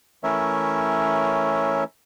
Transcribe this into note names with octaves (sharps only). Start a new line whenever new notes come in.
E3 A3 C#4 A#4 C#5 E5